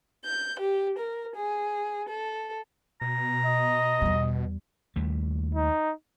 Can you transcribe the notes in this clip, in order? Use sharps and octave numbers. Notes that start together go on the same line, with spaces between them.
G6
G4
A#4
G#4
A4
B2 A#5
D#5
E2 G3
D#2 G3 A3
D#4